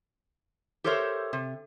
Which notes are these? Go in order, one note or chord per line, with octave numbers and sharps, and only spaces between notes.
G4 A4 A#4 C5 C#5 E5
C3